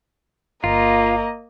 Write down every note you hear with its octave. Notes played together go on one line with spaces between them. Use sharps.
G1 A#3 F4 D#5 A#5